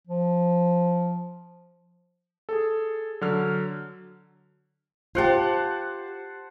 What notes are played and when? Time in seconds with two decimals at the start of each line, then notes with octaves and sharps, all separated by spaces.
0.07 F3
2.49 G#4 A4
3.21 D3 F#3 F6
5.15 F4 G4 C5 F#5 A5